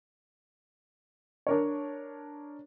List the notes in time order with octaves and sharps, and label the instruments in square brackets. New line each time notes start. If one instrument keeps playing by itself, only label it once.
[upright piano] D4 A#4 C#5